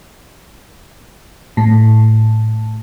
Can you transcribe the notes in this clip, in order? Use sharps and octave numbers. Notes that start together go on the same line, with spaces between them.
A2